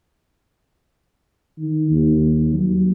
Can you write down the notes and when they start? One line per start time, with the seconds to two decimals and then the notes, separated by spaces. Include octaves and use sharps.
1.59 D#3
1.91 D#2
2.53 F#3